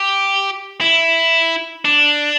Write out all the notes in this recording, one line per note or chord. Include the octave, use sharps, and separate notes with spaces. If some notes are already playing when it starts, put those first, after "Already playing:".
Already playing: G4
E4
D4